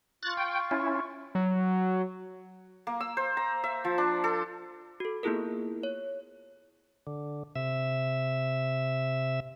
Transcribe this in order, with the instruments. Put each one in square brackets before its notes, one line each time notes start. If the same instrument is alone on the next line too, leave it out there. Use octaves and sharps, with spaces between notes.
[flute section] F4 C#6 [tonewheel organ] F#6 A6
[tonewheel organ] G5
C#4 E4
[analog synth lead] F#3
[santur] A#3
E6
C5
A#5
E5
F3
D4
A4
[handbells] F#4 A4
A#3 B3 E4 F4 G#4 A#4
C#5
[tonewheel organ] D3
C3 E5